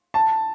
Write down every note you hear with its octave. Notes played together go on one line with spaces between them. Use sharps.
A5